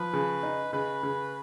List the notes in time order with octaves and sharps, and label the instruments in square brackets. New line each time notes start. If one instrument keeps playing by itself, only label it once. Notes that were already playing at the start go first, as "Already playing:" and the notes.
Already playing: [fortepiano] F3 [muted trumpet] B4
[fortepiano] C#3
D#4
[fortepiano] C#3 [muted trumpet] B4
[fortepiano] C#3